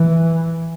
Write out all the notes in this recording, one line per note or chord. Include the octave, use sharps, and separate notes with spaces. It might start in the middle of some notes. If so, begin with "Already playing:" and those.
Already playing: E3